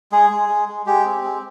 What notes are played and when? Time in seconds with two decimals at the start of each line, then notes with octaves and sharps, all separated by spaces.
0.12 G#3 G#4
0.30 G#3
0.49 G#3
0.68 G#3
0.86 G#3 G4
1.05 C4
1.24 G#3